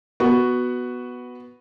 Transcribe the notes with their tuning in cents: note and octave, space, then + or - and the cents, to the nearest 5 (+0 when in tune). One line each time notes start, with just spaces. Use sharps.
B3 +0 F#4 +0